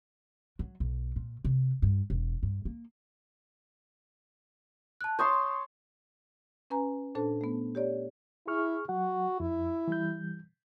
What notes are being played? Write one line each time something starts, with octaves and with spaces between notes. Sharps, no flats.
F#3
B1
A#2
C3
G2
E1
G2
A#3
A5 F#6
C#5 A5 C6 D#6 G6
C#4 B4 G#5 A#5
A#2 D4 A4 C5 A5
A3 B3
G4 C#5 D5
E4 G#4 C#6 F6
F#3 F#4 F#5
F2 E4
E3 G3 G6